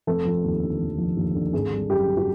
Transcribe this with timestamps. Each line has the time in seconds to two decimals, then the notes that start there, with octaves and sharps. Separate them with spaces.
0.07 F1 A4
0.25 F3
0.44 D#2
0.62 D3
0.80 F1
0.98 F3
1.17 D#2
1.35 D3
1.53 G#1 G#4
1.71 G3
1.89 F#2 G4
2.08 D3
2.17 F#4